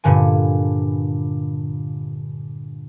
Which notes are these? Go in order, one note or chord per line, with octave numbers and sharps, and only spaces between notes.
G2 A#2 D3 G#5